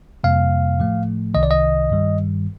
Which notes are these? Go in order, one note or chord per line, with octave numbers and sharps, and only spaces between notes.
F2 C3 G3 A#3 F5
A2 F3 A3
C2 C3 D#3 D#5
D5
D#5
G2 D#3 G3